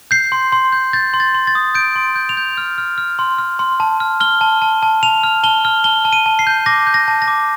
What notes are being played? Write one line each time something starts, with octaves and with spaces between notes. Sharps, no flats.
G6 C7
C6
C6
G6
G6 A6
C6
A6
C6
A6
D#6
G6 D7
C6
G6
F7
G6
F6
F6
F6
C6
F6
C6
A5
F6
F6 G7
A5
A5
A5
A5 F7
F6
A5 G7
F6
A5 G7
A5
D#7
A5
C7
G6
D6 A#6
G6
A#6
A5
A#6
D6